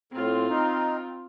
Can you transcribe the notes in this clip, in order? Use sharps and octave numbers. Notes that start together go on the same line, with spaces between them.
A2 C4 F4
D#4